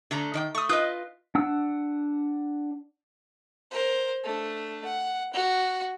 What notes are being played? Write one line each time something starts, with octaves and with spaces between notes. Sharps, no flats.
D3 A3 A#5
D#3 D5 G5
A3 C#6 D#6
F4 B4 D#5 D#6 F#6 G6
D4 F#5 E6
A#4 C5
A3 D4
F#5
F#4